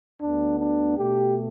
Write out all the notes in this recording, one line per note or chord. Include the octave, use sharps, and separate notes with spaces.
D2 D3 B3 D4
D4
B2 A3 G4